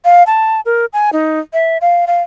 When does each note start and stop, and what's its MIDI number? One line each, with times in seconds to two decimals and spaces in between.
0.05 0.23 77
0.27 0.61 81
0.66 0.86 70
0.93 1.10 80
1.13 1.40 63
1.53 1.78 76
1.81 2.05 77
2.07 2.22 77